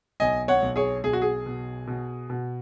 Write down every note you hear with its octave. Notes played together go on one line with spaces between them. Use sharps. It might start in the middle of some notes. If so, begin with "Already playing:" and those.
B1 D#5 G#5
C#5 F#5
B1
G#4 C#5
B1 G#4
F#4
G#4
B2
B2
B2